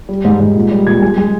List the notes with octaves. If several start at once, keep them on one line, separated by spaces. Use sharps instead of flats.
G3
G#2
G#2
A#2
G3
A#2 G#6
G#3
G#3